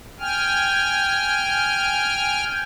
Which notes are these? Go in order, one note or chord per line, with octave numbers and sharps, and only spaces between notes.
G5 G#5 F6